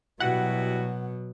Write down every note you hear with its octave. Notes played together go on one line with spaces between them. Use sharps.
B2 F#3 G3 E4 F#4 F#5